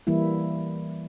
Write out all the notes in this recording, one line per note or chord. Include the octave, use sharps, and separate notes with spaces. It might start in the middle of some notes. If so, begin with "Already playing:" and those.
E3 G3 A#3 E4